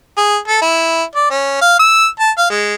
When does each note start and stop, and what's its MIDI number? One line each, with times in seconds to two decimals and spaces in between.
0.17 0.37 68
0.48 0.61 69
0.61 1.03 64
1.15 1.27 74
1.31 1.61 61
1.61 1.75 77
1.79 2.07 88
2.20 2.31 81
2.38 2.45 77
2.50 2.75 56